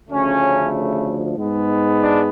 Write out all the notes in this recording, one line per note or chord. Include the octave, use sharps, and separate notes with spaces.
D2 C#3 F3 A3 C#4
G#2 G#3 B3
D4